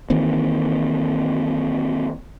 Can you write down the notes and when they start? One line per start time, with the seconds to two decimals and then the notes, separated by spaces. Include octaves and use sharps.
0.10 D#3 E3 A#3 C4